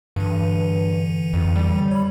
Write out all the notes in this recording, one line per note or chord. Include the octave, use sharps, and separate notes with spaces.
G2 D3 E3
F2
G3
C#5 B5